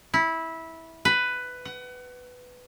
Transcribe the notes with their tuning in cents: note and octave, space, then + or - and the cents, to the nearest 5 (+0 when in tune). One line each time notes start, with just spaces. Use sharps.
E4 -15
B4 +10
F#5 +30